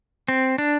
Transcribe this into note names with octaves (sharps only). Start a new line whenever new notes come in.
C4
D4